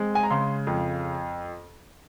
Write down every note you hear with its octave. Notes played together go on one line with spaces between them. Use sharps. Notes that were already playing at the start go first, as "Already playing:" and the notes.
Already playing: G#3 C4
G#5
A#5
C#3 C6
F2